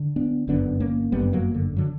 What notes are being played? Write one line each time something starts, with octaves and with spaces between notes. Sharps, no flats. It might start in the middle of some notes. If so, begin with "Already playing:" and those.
Already playing: D3
B3 D4
G1 F#2 D3 B3 D4
A#3 C#4
G1 F#2 D3 G3 B3
F#3 A#3
D3
D3 F#3